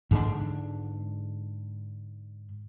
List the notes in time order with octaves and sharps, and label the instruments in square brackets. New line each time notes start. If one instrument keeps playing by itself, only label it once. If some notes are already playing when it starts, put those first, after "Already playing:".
[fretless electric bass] G#2 D3 D4